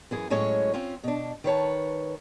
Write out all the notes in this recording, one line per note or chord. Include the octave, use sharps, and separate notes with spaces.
F#2 E3 G#4
A2 F#3 G#3 C#4 C#5
C4 C#4 F4
B2 D4
D#3 B4 C#5 A5